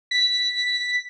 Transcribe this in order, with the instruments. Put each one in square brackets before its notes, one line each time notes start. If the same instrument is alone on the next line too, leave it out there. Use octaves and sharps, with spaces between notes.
[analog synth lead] B6